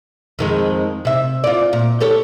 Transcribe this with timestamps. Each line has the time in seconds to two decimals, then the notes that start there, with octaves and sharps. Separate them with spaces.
0.39 F2 D#3 G#3
1.05 C3 E5
1.44 F4 D5
1.73 A#2
2.00 G4 A4 C#5